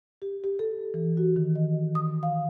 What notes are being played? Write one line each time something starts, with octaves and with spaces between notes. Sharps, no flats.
G4
G4
A4
E3
F#4
D#3
D#5
D#6
F5